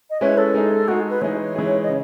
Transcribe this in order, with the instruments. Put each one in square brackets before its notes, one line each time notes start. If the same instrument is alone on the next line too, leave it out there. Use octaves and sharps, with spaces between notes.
[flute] D#5
[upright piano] G#3 C#4 E4 B4 [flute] C#5
[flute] A4
[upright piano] G#3 D#4 G#4
[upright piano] G#3 D#4 G#4 [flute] F#4
[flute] B4
[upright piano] E3 G#3 D#4 G#4 [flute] C#5
[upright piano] E3 G#3 D#4 G#4
[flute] D#5
[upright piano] C#3